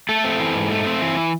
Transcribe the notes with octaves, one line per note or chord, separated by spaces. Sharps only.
A3 A4
C4
E3
G#2
A3
C4
E3